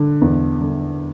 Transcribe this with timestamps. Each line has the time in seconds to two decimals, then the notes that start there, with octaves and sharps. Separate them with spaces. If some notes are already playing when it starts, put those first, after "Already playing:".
Already playing: D3
0.22 E2
0.61 D3